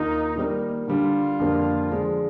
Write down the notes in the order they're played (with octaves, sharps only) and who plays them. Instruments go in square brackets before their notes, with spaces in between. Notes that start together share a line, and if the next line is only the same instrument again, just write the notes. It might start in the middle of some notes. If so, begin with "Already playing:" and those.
Already playing: [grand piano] D#2 D#3 A#3 F4 [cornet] D#4
[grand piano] D#3 G3 A#3
[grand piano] D3 G3 D4 [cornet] F4
[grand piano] F2 D3 G3 A#3
D3 F3 G#3 D4 G#4